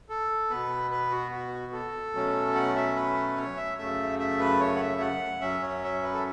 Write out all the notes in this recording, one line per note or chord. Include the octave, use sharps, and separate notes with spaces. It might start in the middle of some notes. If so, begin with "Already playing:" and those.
A4
B2 B3 B4
B4
F#4
F#4
A4
B2 F#3 A3 C#4
F#5
E5
B4
C#5
E5
F#2 C#3 A3 E5
E5
B4
C#5
F#5
E5
F#5
F#2 F#3 C#4 E5
C#5
E5
B4
A4